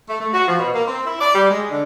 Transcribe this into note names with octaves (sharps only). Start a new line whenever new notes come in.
A3
A3
F#4
F3
B2
A#3
C4
E4
D5
G3
G#3
D3